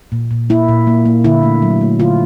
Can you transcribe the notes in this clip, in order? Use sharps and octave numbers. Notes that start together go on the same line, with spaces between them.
A#2
A#2
A#3 E4
A#2
A#3
A#3
D3 E4
A3
F#3
A3
D3 F4